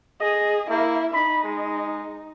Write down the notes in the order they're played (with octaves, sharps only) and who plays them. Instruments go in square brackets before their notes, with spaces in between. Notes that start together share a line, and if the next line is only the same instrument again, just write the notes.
[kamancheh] G#4 [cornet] D#5
[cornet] A#3 [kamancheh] E4 E5
[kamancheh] D#4 [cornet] B5
[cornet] G#3